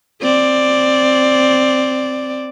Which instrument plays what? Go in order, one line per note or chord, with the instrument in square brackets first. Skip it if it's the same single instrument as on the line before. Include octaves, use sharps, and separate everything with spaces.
[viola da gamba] C4 D5